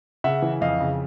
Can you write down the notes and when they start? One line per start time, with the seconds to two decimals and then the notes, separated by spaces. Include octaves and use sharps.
0.24 C#3 E5 F#5
0.42 E3
0.61 F2 D#5 F5
0.80 C#3